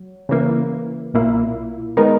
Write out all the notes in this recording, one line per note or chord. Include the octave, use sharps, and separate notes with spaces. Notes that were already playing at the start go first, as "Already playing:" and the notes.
Already playing: F#3
C#3 E3 A#3
B1 A#2 A#3 E4
D#3 G#3 B3 D#4 A#4